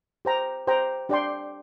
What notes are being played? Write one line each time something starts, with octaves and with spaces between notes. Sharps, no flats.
G4 C5 G5 A#5
G4 C5 G5 A#5
D4 G4 D5 G5 C6